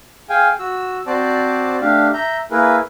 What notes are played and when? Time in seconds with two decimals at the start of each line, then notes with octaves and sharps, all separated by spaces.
0.30 G#4 F5 G5 G#5
0.59 F#4 E6
1.07 C4 F#4 C5 D5 A5 D6
1.81 A3 D4 G4 F5
2.13 E5 A#5 G6
2.51 A#3 E4 G#4 A#4 B4